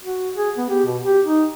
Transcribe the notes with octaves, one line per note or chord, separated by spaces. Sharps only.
F#4
G#4
B3
G4
B2
G4
D#4